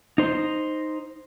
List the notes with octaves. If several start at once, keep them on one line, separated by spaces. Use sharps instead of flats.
D#4 C5